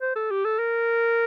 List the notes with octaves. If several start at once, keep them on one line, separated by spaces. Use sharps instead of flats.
C5
A4
G4
A4
A#4